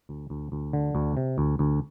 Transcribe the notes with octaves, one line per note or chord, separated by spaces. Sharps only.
D2
D2
D2
D3
D2
C3
D2
D2